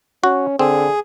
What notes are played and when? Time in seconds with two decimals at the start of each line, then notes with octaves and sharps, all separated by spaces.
0.24 C#4 F#4
0.59 D3 C4 G#4